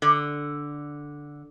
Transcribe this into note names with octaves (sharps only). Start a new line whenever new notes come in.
D3